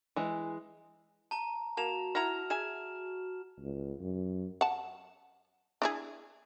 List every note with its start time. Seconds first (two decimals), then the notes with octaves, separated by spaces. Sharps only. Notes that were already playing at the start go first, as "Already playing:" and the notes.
0.16 E3 G#3
1.31 A5 A#5
1.77 A#3 F#4 A5 E7 F7
2.15 E4 F#5 A#5 F6 F7
2.50 G#4 E5 G#5 E7
3.60 C#2
4.00 F#2
4.61 F#5 A5
5.82 D4 E4 G#4